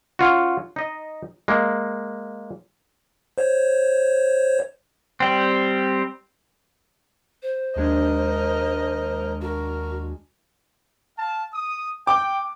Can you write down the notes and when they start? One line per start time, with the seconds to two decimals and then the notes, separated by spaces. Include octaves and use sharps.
0.19 C#4 F4 F#4
0.76 D#4 D#5
1.48 G#3 A#3
3.38 C5 C#5
5.20 G3 C4
7.42 C5
7.76 D#2 G#3 D4 A#4 D#5
9.41 F#4 A#4
11.17 F5 A5
11.54 D#6
12.07 G5 D6